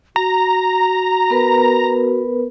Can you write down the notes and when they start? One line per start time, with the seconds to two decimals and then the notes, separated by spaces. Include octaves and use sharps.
0.16 F#4 A#5
1.30 B3 A#4 B4